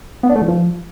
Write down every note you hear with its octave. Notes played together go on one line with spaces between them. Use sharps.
B3
D4
A3
E3
F3